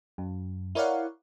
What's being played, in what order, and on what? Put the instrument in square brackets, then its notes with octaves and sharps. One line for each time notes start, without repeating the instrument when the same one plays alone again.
[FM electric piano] F#2
E4 A#4 C#5 D5 F5 F#5